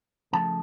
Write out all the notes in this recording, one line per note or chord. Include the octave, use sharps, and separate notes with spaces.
C#3 F3 A3 A5